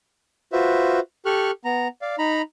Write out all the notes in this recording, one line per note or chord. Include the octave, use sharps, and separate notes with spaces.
F4 F#4 B4 C5 E5
G4 A4 C#6 F6 F#6
B3 A#5
D5 F5
D#4 A#5 B5